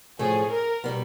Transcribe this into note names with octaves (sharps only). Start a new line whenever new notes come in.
A2 F3 A3 C#4 G#4
A#4
B2 G3 B3